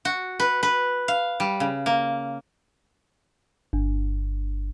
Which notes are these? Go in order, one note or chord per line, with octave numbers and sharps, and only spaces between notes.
F#4
B4
B4
F5
G3
C#3
A#3
G1